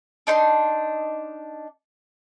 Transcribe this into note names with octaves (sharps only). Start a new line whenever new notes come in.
D4 D#4 C6